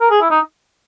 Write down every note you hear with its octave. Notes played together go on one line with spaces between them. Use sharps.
A#4
G#4
E4
D#4